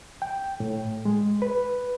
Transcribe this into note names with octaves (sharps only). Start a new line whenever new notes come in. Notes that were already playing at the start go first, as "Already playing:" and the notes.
G5
A2
G#3
B4